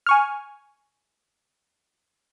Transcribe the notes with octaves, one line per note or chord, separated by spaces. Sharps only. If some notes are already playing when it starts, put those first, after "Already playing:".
G#5 C#6 F6